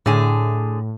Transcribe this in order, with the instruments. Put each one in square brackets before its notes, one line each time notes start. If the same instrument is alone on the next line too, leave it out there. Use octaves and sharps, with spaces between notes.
[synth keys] A2 [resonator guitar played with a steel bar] D3 G#4